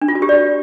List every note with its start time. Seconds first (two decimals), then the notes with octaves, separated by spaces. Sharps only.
0.02 D4
0.08 F4
0.15 F#4
0.22 G4
0.29 D5